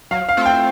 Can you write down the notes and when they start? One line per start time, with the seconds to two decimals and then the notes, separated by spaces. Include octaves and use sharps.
0.11 F#3 F5
0.29 F5
0.37 A3 C4 F4 A4
0.46 G5